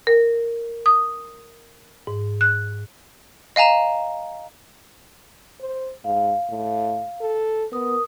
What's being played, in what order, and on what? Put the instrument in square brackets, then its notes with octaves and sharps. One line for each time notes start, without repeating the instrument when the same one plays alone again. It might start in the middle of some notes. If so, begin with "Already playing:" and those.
[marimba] A#4
D#6
G#2
F#6
[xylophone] D#5 F5 G#5 A#5 E7
[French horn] C5
[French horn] G#2 [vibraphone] F5
[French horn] A2
A4
[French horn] B3 [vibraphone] A#4 D#6